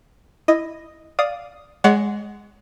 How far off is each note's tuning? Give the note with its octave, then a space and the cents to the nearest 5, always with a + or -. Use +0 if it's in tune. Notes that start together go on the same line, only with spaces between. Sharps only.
E4 +0 D#5 +0
D5 +0 F5 +0 D#6 +0
G#3 +0 C#5 +40 F#5 +0